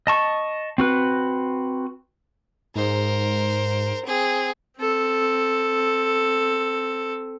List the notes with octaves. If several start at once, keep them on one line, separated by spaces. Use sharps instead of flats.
D#5 A5 C#6
C4 F#4 B4
G#2 A#4 C5
C4 G#4
C4 A4